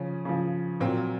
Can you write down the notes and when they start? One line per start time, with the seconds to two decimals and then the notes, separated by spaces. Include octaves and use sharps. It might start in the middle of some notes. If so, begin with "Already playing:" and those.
Already playing: C#3 F3 C#4
0.25 C#3 F3
0.80 A#2 F#3 C4